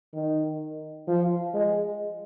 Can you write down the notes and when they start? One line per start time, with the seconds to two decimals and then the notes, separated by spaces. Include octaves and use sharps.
0.13 D#3
1.08 F3
1.54 G#3